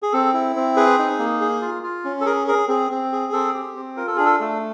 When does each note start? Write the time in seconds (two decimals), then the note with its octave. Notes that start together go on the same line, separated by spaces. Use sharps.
0.03 G#4
0.13 C4 A4
0.33 E4
0.56 C4
0.76 G#4 B4
0.99 D#4
1.19 A#3
1.41 G#4
1.62 F4
1.83 F4
2.05 C#4
2.21 A4
2.26 G#4 A#4
2.48 G#4 A#4
2.68 C4 G#4
2.91 C4
3.12 G#4
3.32 C4 A4
3.54 G4
3.76 C4
3.97 F4 A#4
4.07 A4
4.16 D4 G#4
4.25 A4
4.40 A3